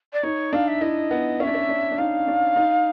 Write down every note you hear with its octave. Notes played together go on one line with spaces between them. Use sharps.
D5
D#4 C#5
D4 F5
E5
E4 D#5
B3
C#4 F5
D4 E5
C#4
D4
D4
D#4 F5
D4
D#4